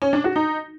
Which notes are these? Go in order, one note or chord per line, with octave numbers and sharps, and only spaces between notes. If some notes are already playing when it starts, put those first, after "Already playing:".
C#4
D4
F#4
D#4